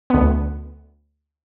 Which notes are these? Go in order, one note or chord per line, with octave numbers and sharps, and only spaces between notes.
D2 B3